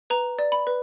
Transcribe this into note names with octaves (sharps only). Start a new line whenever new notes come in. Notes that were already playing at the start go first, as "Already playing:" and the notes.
B4 A#5
D5
B5
B4